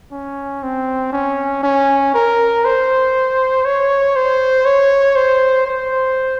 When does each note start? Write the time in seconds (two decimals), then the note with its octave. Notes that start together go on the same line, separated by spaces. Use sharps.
0.12 C#4
0.63 C4
1.13 C#4
1.63 C#4
2.14 A#4
2.65 C5
3.65 C#5
4.16 C5
4.65 C#5
5.16 C5
5.66 C5